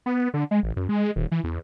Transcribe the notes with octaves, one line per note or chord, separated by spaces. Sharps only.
B3
D3
G#3
A1
F#2
G#3
D#1
E3
E2